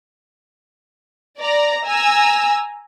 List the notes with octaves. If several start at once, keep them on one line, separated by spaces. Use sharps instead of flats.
D5 A#5
G#5 A#5 E6